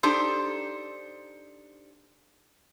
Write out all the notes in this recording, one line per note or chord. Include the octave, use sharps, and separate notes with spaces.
D4 D#4 G4 A4 C5